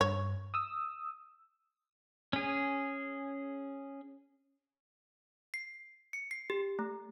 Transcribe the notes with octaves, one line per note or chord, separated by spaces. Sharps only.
G2 C#5
D#6 E6
C#4 G#4
C7
C#7
C7
G4
A3